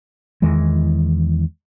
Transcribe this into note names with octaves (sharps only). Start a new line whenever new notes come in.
E2 D#3 E3 G#3